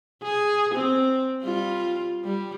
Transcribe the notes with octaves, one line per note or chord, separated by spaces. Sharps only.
G#4
C4
G3 F4
G3